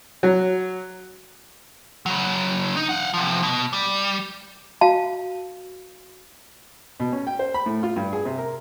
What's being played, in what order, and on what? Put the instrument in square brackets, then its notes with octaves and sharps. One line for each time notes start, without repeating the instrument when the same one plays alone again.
[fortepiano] F#3
[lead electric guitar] C#3 F#3
D#4
F5 F#5
C3 F3
B2
G3
[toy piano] F#4 F5 A5
[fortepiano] B2
C#4
G5
C5
B5
A2
F4
G2
G#4
C3
A#4